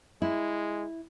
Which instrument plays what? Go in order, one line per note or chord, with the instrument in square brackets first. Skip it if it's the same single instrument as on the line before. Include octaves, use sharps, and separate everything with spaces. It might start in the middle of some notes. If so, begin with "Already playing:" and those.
[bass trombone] G#3 [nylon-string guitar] E4